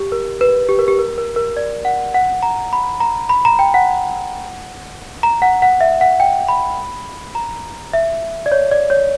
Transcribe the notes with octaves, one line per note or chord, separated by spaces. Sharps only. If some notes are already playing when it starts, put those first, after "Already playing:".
Already playing: G4
A#4
B4
G4
A#4
G4
A#4
A#4
A#4
D5
F#5
F#5
A#5
B5
A#5
B5
A#5
G5
F#5
A#5
F#5
F#5
E5
F#5
G5
B5
A#5
E5
D5
C#5
D5
C#5